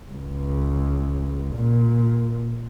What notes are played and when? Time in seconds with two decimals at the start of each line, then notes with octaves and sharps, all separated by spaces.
0.13 C#2
1.56 A#2